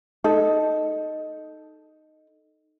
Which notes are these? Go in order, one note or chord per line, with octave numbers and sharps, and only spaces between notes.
D#4 A4